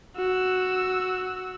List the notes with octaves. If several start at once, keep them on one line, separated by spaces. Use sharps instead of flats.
F#4 E6